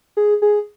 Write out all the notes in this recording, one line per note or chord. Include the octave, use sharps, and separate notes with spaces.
G#4
G#4